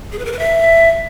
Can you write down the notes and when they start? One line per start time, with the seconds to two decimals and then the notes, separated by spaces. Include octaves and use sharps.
0.12 G#4
0.19 B4
0.26 A#4
0.32 B4
0.39 E5